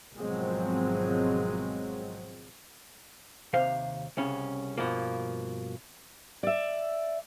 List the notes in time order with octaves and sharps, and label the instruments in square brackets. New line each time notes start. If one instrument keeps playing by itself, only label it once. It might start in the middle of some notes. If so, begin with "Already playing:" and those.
[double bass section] G#1 B2 F3 F#3 G#3 C4
[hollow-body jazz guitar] D#2 C3 C5 F5
C2 C#3 C#4
G2 B2 F3 A#3
[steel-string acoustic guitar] D5 E5